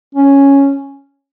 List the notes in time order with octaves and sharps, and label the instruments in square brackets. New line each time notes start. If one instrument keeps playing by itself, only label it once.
[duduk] C#4